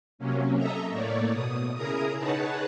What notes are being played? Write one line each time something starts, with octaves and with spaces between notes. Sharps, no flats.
C3 F#3 A#3 C#4
A4 D#5 E5 A#5
A2 A3 A#3 C#5 D5
B2 D#6
C#3 E4 G#4 A#4 A#5 D#6
D#4 G#4 B4 C#5 F#5 A5